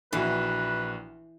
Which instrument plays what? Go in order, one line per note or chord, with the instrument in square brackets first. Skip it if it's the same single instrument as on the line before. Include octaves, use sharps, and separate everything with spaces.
[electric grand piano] A#1 F#4 [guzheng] E3 [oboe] B4